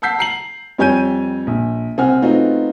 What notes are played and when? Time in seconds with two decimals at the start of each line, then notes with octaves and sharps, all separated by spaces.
0.02 F#5 A5 E6 G6 B6 C7
0.19 A#5 C7 F#7
0.78 F2 G3 C#5 G#5 G6 D#7
1.47 A#1
1.98 C2 C4 F#5 G#5 F6
2.22 A3 B3 C4 D#4 F4 F#4